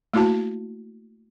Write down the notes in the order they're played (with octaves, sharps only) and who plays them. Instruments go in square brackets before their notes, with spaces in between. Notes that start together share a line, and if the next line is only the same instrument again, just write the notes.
[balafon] A3 A#3 E4 F#4 A5